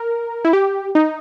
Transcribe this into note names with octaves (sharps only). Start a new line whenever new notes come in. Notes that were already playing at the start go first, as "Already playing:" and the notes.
Already playing: A#4
E4
G4
D#4